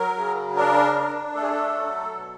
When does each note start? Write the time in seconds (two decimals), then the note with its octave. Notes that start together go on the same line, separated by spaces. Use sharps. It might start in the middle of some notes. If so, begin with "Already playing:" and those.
Already playing: F#3 A#4
0.17 C#3
0.56 D4 A#4
0.96 D4
1.35 A3 A4
1.42 G#4
1.50 A4
1.75 F#3
2.15 B2